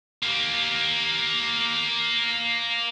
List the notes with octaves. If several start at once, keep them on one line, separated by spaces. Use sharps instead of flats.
A#3 G4